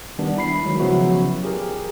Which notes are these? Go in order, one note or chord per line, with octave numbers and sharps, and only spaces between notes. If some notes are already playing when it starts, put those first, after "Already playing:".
D#3 G3 B3 D4
E4 B5 C7
D#3 F#3 G#3
C#3 F3 F#3 B3 E4 F#4
G4 G#4 A#4